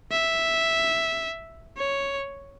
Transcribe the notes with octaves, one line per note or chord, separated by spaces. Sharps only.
E5
C#5